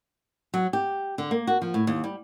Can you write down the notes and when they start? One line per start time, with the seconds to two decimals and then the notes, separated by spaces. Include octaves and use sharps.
0.54 F#3
0.73 G4
1.18 D3
1.31 A#3
1.47 F#4
1.62 F3
1.74 A2
1.87 D#2
2.04 G3